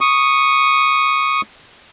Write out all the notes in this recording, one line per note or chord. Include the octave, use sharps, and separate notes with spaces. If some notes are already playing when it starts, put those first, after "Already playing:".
C#6 D#6